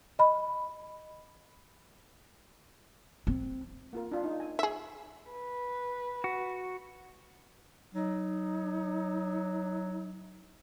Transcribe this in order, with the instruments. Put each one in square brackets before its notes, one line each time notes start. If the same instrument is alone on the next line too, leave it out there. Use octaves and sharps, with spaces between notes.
[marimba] D#5 B5
[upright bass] C4
[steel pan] A#3 F4 A#4
D4 F4
D#4
G#5
[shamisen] G#4 E5
[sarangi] B4
[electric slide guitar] F#4
[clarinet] F#3 [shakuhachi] D#4